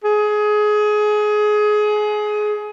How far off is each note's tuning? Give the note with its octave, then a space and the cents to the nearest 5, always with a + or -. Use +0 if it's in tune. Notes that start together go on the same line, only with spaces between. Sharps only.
G#4 +20